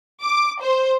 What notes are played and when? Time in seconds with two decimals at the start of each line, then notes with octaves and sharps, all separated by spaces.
0.22 D6
0.61 C5